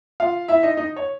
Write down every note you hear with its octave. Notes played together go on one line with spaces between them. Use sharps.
F4 F5
E4 E5
D#4 D#5
D#4 D#5
C#5